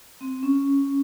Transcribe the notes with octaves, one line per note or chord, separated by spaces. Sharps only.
C4
C#4